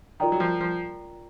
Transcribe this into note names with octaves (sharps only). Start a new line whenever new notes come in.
D#3 F4 A#4 D5 G5 A#5
F#3
F3
F3